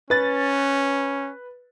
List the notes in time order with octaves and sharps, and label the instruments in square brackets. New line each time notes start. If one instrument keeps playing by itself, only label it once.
[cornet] C#4 [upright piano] B4 A6